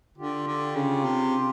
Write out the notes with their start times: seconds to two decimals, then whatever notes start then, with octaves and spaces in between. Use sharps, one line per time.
0.18 D3 F4 G4
0.47 D3
0.75 C#3
1.05 C3